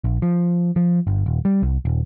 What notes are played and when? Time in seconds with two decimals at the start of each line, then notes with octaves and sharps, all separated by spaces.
0.04 A#1
0.22 F3
0.76 F3
1.07 G1
1.26 D#1
1.45 G3
1.62 C2
1.85 D#1